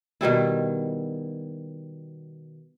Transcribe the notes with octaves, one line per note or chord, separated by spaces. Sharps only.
B2 D#3 G3 E4